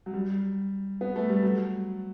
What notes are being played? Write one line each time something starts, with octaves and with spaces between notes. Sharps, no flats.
F#3
G3
B3
A3
G3
F#3